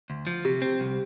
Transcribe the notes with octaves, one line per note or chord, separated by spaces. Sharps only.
D2
F3
C3 G4
C4
C2